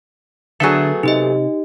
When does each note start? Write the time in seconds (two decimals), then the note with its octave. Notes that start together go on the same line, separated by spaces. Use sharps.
0.60 D3 F#3 A3 B3 G#4 A4
1.03 C3 D#4 G4 D#5